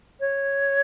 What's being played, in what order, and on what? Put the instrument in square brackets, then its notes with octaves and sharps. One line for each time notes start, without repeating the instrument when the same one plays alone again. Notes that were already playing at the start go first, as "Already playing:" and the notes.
[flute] C#5